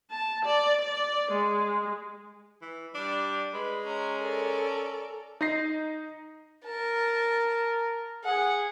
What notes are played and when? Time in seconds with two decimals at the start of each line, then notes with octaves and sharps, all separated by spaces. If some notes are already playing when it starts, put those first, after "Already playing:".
0.11 A5
0.45 D5
0.81 D5
1.31 G#3
2.62 E3
2.95 G3 D4
3.54 G#3 B4
3.86 C#4 A#5
4.18 A4 A#4 D5
5.41 D#4 D#5 A#6 C7
6.65 A#4 A5
8.25 G#4 F#5